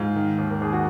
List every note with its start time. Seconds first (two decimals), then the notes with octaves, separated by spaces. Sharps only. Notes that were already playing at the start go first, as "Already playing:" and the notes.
Already playing: G#2 F4
0.16 D#3
0.38 D#2
0.51 A#4
0.61 D#2 G#4
0.73 F#4